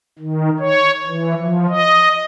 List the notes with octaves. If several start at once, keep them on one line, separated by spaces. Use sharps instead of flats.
D#3
C#5
E3
F3
D#5